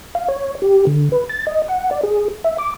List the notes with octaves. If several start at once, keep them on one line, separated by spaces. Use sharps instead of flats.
F5
C#5
G4
D3
B4
A6
D#5
F#5
D5
G#4
E5
D6